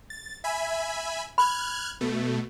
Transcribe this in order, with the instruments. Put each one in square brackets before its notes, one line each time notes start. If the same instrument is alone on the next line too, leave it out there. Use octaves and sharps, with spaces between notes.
[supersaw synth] A6
E5 G#5 B5
[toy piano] B5 [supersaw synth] F6 F#6 G#6
[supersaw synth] B2 A3